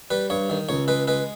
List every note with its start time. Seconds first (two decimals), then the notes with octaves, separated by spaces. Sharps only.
0.10 G3 B4
0.30 G2 C#5
0.50 D#3
0.69 C#2 C#5
0.88 G#3 B4
1.08 G#3 B4